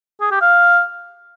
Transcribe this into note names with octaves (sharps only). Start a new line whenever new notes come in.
G#4
G4
F5